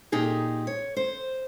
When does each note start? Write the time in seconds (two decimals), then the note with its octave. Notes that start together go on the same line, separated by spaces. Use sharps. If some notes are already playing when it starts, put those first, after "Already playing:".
0.12 A#2 D#4 G4 G#4
0.67 C#5
0.97 C5